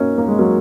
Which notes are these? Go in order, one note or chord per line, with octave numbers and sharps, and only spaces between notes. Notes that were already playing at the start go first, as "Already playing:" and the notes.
Already playing: A#3 C#4 D#4 F#4
A#3
G#3
F#3 A#3